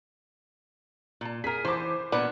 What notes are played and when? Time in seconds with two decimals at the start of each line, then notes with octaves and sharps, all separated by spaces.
1.21 A#2 A5
1.44 G#4 A#4 B6
1.65 E3 C5 A5 D6
2.12 A#2 B3 D4 A#4 B4